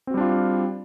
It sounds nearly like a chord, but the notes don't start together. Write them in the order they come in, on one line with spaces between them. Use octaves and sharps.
C4 F#4 G3 D4 F4